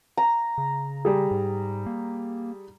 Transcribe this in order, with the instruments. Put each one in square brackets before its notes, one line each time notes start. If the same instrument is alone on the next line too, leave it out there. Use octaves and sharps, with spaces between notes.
[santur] A#5
[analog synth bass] C#3
[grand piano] G3 G#4
[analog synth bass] G#2
A#3